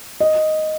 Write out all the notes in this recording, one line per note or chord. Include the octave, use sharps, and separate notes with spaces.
D#5